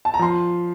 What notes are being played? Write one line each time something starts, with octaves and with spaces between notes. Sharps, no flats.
A5
A#5
F3 C6